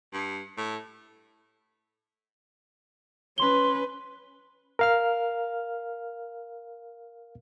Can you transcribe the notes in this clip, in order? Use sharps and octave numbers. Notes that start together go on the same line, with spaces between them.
G2
A2
C#4 B4 C6 G7
A#4 F5 F6